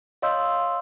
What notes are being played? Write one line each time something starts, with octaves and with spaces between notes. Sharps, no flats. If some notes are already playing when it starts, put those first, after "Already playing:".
C#5 D#5 F5 C6 E6 G6